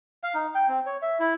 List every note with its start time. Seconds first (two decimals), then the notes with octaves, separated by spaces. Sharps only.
0.23 F5
0.35 D#4
0.55 G5
0.69 C4
0.86 C#5
1.02 E5
1.20 E4